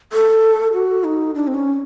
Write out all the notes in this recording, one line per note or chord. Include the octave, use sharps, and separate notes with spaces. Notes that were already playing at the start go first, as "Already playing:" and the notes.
A4
F#4
D#4
D4
C4
C#4